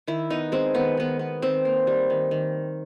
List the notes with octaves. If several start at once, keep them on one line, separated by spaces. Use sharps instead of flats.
D#3 E4
B3 D#4
G#3 C4
D#3 B3
D#3 B3
B3
D#3 C4
A#3
G3
D#3
D#3